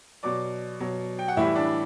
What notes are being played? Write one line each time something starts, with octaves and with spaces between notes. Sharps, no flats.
B2 F#3 D5 D6
B2 F#3
G5
F#5
A2 E3 G3 E4 E5
D4 D5